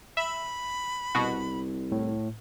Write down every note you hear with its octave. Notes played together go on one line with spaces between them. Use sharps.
E5 B5
C2 B2 F#4
A2